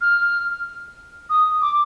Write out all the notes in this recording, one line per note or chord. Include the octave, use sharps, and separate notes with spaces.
F6
D#6
D6